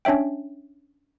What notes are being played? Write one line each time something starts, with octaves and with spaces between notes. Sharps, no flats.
C#4 D4 C#5 E5 G5